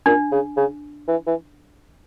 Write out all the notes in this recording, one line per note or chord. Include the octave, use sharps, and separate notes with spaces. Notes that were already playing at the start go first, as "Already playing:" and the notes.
A#2 D4
C#3
C#3
E3
E3